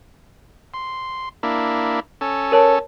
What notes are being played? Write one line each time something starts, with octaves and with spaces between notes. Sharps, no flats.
C6
A#3 D4 E4
C#4 A4
A#4 C#5 A5